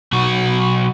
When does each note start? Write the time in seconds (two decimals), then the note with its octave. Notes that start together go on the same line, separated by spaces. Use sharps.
0.13 B1 F#4